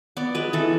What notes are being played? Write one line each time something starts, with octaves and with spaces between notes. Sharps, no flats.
B3 D5
G#3 B4
E3 A4